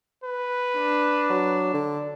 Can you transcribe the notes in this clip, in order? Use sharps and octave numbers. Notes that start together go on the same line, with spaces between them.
B4
D4
F#3
D3